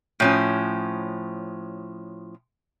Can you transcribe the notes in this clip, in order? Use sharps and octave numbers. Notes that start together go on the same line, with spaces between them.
A2 F3 C#4